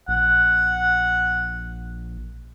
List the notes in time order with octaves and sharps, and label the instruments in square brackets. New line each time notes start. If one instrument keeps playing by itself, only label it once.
[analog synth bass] A#1 [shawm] F#5